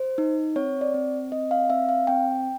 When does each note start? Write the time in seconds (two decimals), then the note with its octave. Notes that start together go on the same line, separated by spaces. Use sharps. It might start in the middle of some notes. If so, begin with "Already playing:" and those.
Already playing: C5
0.18 D#4
0.56 C4 C#5
0.81 D5
0.94 C4
1.32 C4 D#5
1.51 F5
1.70 C4 E5
1.89 F5
2.07 C4 G5